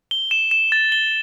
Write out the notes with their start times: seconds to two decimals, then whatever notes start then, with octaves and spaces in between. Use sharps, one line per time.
0.11 G7
0.31 E7
0.51 E7
0.72 A6
0.92 G7